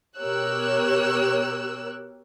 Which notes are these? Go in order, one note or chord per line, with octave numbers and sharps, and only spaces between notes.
B2 G4 A#4 C#5 E6 F#6